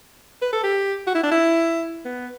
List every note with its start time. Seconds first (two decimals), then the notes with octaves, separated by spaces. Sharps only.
0.42 B4
0.52 A4
0.63 G4
1.07 F#4
1.15 E4
1.23 D4
1.31 E4
2.05 B3